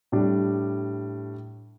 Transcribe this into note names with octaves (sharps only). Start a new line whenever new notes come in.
A2 G3 D4